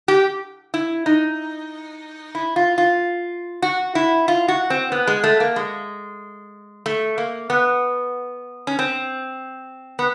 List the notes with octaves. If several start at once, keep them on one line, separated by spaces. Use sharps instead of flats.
G4
E4
D#4
E4
F4
F4
F#4
E4
F4
F#4
C4
B3
G#3
A3
A#3
G#3
A3
A#3
B3
C#4
C4
B3